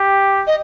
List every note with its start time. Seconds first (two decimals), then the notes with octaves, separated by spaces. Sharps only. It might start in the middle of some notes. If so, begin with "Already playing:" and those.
Already playing: G4
0.47 D#5